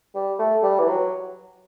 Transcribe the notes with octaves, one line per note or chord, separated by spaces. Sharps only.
G3
A3
G3
E3
F#3